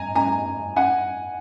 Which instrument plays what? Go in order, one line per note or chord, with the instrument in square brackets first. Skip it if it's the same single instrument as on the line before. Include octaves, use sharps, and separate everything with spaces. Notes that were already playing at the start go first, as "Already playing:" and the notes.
Already playing: [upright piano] G#5 A#5
G#5 A#5
F#5 G#5